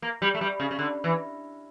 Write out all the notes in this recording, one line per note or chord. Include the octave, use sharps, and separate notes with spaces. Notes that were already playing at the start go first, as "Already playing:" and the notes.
A#3
G3
A3
G3
C#3
C#3
D3
E3